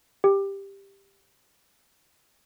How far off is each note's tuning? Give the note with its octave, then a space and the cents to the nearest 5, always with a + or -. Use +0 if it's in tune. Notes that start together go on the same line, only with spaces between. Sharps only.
G4 +10